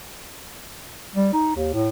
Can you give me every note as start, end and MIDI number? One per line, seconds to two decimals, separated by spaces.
1.15 1.30 55
1.33 1.51 63
1.56 1.73 39
1.73 1.89 45